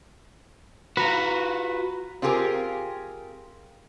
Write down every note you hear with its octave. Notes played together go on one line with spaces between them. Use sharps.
F4 F#4 B4 A#5
C4 F4 G4 G#4 A#4